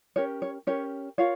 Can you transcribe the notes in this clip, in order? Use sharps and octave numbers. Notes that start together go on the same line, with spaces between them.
C#4 G4 A#4 C#5
C#5
C#4 G4 A#4 C#5
F4 A#4 C#5 F5